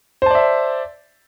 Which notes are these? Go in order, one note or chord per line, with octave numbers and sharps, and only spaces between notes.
C5 D5 E5 A5